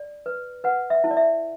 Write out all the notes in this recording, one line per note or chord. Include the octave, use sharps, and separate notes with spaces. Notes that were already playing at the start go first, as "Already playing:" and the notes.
Already playing: D5
B4
B4 F#5
E5
E4
D5
E5